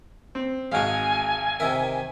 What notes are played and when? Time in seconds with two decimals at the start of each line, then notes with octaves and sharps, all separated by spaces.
0.35 C4
0.72 G#1 G#3 F#4 F5 G#5
1.60 C3 D#3 A#4 E5